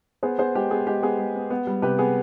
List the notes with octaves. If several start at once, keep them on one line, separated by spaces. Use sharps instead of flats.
B3 G#4 C5
B3 G#4 C5
G#3 G4
B3 G#4
G#3 G4
B3 G#4
G#3
B3
B3
G3
C3 G4 B4
B3 G#4